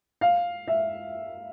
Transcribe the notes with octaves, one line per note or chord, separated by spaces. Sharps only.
F5
E5